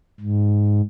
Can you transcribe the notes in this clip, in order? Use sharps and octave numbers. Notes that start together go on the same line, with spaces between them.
G#2